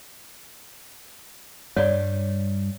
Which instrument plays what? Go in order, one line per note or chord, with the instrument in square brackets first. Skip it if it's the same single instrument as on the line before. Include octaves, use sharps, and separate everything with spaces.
[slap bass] G2 G3 [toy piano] C#5 D5